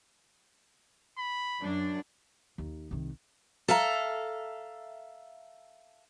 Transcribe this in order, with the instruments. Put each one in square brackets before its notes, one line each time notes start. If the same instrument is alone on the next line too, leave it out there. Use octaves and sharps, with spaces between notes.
[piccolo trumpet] B5
[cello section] F#2 D4
[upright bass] D#2
C2 D#3
[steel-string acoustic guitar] A4 E5 F5 A#5